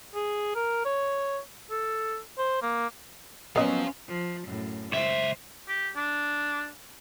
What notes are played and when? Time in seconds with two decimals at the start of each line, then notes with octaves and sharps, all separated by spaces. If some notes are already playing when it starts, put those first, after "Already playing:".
0.15 G#4
0.55 A#4
0.85 C#5
1.71 A4
2.38 C5
2.62 A#3
3.56 F#3 A#3 B3 C#4 C5 D#5 F5
4.07 F3
4.44 F#2 A2
4.92 C#2 C5 E5
5.68 G4
5.96 D4